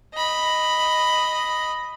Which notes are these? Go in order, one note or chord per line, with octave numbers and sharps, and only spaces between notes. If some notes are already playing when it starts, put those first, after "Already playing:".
D#5 B5